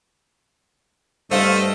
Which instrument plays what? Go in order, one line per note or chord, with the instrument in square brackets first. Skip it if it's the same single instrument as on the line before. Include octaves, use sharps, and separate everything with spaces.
[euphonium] G2 [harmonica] A3 D#5 [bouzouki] C5 F5